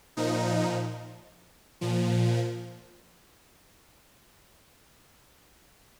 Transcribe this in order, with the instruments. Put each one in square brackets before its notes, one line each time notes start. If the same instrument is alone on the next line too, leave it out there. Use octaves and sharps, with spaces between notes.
[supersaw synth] A#2 F3 D#4
A#2 F3